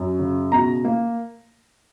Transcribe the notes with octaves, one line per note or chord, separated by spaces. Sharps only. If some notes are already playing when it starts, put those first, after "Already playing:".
Already playing: F#2
C#3
B2 A#5
A#3